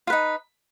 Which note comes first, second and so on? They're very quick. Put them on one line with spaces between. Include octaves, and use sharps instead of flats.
F4 B4 D#4